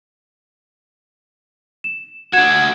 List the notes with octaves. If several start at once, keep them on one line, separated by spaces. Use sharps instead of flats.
E7
D4 F#4 G#6 E7